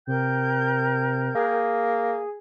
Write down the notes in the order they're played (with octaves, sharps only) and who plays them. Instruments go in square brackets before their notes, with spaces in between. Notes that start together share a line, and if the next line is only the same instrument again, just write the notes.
[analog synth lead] C3 [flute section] A#4 G5 G6
[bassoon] A#3 [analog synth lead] G#4